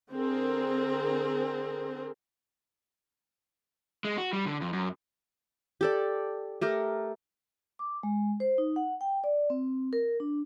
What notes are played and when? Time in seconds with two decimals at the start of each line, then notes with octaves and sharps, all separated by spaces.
0.12 D3 C4 G#4 A#4
4.05 G#3
4.18 F#4
4.33 G3
4.46 D3
4.61 F2
4.73 F#2
5.81 G4 A4 D5
6.61 A3 G4 A#4
7.79 D6
8.03 G#3
8.40 C5
8.58 D#4
8.76 F#5
9.01 G5
9.24 D5
9.50 C4
9.93 A#4
10.20 D4